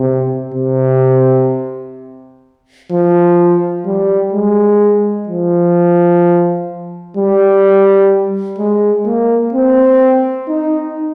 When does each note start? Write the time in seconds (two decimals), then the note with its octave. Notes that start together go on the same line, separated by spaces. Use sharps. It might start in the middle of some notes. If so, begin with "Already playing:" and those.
Already playing: C3
0.54 C3
2.91 F3
3.86 G3
4.33 G#3
5.28 F3
7.17 G3
8.59 G#3
9.06 A#3
9.53 C4
10.48 D#4